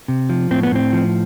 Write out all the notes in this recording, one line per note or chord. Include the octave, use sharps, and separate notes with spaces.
C3
F3
A2 C4
B3
A2 C4
F3